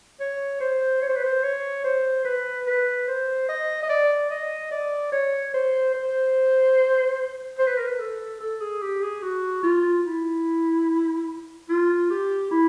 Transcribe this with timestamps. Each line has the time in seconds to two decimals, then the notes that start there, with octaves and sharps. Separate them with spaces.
0.20 C#5
0.60 C5
1.02 C#5
1.09 C5
1.17 B4
1.23 C5
1.43 C#5
1.84 C5
2.24 B4
2.66 B4
3.08 C5
3.48 D#5
3.83 D#5
3.89 D5
4.30 D#5
4.71 D5
5.12 C#5
5.54 C5
5.94 C5
7.58 C5
7.67 B4
7.78 A#4
7.87 B4
7.99 A4
8.40 A4
8.60 G#4
8.82 G4
9.02 G#4
9.22 F#4
9.63 F4
10.05 E4
11.69 F4
12.10 G4
12.51 E4